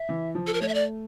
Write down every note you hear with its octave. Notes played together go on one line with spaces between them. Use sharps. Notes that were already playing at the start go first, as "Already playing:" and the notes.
Already playing: E5
E3
F3
A4
A#4
A3 C#5
E5
D5